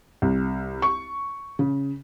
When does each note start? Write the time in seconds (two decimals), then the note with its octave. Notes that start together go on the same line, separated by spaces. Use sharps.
0.22 C2
0.82 C#6
1.59 C#3